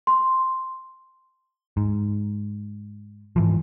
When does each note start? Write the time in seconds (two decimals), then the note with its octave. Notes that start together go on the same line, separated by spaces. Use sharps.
0.07 C6
1.77 G#2
3.36 G#2 E3 F3